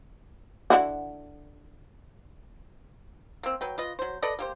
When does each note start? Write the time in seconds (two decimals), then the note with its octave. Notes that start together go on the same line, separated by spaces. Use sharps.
0.70 D3 E4 F#4
3.43 A#3 C4
3.61 F#3 B4 G5
3.78 F4 B4 D#5
3.99 F#3 C5
4.22 A4 B4 D5 D#5
4.39 A#3 G4 C5